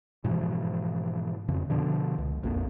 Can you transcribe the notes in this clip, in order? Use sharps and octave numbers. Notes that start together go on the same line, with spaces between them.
G#2 B2 E3 F3
F2 C#3
B2 D3 F3
C#2
D#1 A#1 F2 A#3